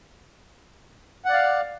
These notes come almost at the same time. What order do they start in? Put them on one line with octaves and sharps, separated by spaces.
F#5 D5 F5